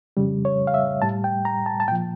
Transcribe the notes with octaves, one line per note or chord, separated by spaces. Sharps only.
F2 C#3 G3
C#5
F5
E5
A2 G3 A5
G5
A#5
A5
A5
A#2 F3 G5